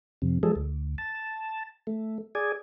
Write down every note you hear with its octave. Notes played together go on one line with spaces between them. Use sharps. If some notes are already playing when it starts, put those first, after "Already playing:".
F2 C3
F3 G3 G#3 G#4 A4
D2
A5
A3
G#4 D5 G#5